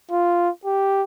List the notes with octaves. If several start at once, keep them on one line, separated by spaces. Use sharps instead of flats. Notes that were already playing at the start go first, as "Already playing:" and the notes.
F4
G4